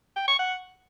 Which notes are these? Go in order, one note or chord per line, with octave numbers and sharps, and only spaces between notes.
G5
C#6
F#5